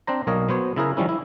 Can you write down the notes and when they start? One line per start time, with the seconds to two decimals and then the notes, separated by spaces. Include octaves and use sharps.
0.07 C4 D4 C5 A#5
0.27 B1 A#3 A#4 C#5 D#5
0.49 F#3 B3 C5 C#5
0.76 C#3 E4 G#4 A#4
0.97 D#3 F3 G3 C#4 E4
1.09 E4